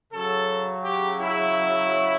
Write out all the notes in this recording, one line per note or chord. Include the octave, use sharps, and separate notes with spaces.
C#3 F#3 A4
G4
E4